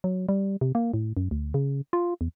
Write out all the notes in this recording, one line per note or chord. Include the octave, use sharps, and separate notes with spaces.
F#3
G3
C3
A#3
A2
F#2
D2
C#3
F4
E2